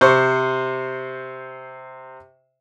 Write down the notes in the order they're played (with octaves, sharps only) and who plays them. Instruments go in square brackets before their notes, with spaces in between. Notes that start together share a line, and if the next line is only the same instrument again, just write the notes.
[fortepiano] C3 C5 C#6